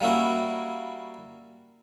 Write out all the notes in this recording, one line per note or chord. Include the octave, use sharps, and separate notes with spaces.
G3 A#3 C#4 E4 F#4